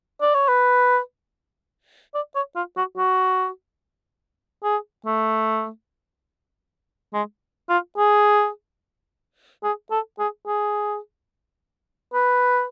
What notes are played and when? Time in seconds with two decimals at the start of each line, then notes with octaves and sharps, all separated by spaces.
0.21 D5
0.35 C#5
0.48 B4
2.15 D5
2.35 C#5
2.56 F4
2.77 F#4
2.98 F#4
4.64 G#4
5.06 A3
7.14 G#3
7.69 F4
7.98 G#4
9.64 G#4
9.91 A4
10.19 G#4
10.47 G#4
12.14 B4